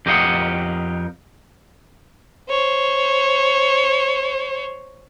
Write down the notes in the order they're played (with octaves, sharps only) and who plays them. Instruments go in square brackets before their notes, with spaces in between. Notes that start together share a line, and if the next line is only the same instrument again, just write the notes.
[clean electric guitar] F2 G4 A#4 D#5 F5 F#5
[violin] C5 C#5